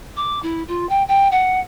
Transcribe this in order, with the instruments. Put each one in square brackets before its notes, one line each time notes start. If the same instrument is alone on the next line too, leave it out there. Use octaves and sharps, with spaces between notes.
[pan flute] D6
E4
F4
G5
G5
F#5